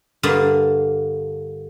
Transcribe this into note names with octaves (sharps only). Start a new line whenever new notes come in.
G2 D3 A#3